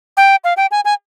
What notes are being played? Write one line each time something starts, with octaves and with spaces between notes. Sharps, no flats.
G5
F5
G5
G#5
G#5